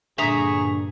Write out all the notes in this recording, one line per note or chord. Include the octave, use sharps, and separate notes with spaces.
G2 A#2 D3 G#4 E5 A#5 C#6 D#6